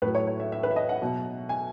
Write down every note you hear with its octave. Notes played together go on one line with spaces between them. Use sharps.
A2 F#3 B4
C#5
C#5
E5
E5
B4
E5
D#5
F#5
B2 F#3
G#5